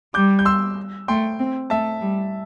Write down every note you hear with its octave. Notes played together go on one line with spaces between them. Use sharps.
G3 D6 G6
G6
C6 E6
A3 G5 C6
C4
A3 E5 A5
G3